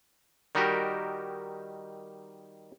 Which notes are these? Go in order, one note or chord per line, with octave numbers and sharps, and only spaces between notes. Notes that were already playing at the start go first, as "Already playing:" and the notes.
D#3 G3 D#4 F#4 G4 A#4